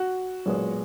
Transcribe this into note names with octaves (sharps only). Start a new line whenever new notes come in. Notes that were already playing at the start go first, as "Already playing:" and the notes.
Already playing: F#4
B1 A#2 G#3 B3